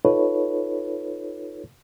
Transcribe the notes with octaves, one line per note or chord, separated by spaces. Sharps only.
D#4 F4 A4 B4 C#5